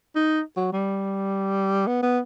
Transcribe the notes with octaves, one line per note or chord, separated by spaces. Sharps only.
D#4
F#3
G3
B3
B3